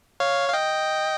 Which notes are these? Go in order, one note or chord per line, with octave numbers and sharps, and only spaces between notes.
C#5 F5
F5
D#5 G5